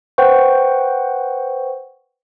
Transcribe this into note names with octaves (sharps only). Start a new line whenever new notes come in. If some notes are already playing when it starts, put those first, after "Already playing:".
B4 C5 F#5 G5 C#6